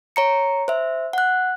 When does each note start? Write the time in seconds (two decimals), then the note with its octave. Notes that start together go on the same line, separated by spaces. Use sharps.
0.16 C#5 A#5 C#7
0.68 C5 E5
1.13 F#5 F#6